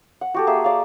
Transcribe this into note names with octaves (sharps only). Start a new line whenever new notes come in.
F#5
F#4 G4 A4
A#3 G#4 E5
D5 F5